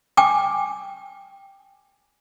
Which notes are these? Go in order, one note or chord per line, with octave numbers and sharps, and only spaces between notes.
G5 G#5 D6